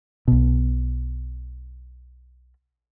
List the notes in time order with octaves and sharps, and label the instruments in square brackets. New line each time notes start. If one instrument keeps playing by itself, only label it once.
[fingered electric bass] B1 B2